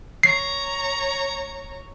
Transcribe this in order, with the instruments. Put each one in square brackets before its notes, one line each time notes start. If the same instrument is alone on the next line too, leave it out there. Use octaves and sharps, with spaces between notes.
[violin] C#5 A#5 [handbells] C7